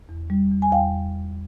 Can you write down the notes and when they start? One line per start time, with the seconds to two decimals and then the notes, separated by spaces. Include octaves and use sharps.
0.09 E2
0.30 G3
0.51 E2
0.62 G#5
0.72 E2 F5 G5